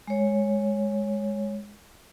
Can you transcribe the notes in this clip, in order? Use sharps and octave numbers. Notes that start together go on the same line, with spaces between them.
G#3 C#5